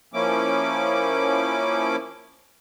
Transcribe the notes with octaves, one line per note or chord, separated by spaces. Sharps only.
F3 A#3 C#4 E4 D6